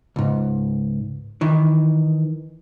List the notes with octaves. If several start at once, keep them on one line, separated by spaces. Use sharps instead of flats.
C#2 G#2
D#3 E3